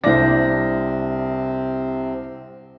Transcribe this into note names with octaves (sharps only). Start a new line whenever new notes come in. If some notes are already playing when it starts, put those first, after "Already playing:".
C2 C3 C4 D4 C5 A#6